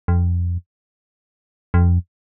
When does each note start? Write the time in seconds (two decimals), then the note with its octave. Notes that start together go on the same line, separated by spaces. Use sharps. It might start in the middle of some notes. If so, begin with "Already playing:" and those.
0.08 F2
1.74 F2